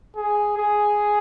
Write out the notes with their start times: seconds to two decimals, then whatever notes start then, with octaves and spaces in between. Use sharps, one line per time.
0.16 G#4
0.58 G#4